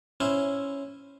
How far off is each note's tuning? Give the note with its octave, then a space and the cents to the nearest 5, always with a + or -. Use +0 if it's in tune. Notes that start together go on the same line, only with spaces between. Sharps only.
C#4 +0 E4 +0 C5 +0